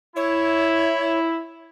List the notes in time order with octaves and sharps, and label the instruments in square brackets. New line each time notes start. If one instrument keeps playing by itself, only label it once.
[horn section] E4 [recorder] C#5